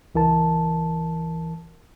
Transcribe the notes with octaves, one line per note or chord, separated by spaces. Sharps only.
C#2 E3 A#4 A5